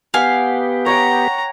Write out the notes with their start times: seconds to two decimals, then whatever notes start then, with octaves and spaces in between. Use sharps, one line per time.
0.14 B3 G4 F5 F#5 G#5
0.86 C#5 F#5 G5 A#5